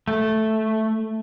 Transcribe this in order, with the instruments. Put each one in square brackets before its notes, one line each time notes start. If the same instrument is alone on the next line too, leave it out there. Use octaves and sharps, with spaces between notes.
[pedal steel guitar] A3